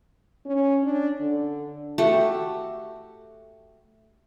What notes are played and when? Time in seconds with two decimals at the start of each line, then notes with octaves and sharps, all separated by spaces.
0.46 C#4
0.83 D4
1.20 D3
1.98 A3 F#4 G4